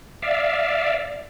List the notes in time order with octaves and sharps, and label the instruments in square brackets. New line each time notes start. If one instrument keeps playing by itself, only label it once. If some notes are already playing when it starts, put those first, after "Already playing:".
[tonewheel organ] D5 E5 F5